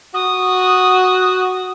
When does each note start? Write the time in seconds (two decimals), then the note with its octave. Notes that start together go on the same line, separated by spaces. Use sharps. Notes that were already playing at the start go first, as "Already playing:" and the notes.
0.14 F#4 D#6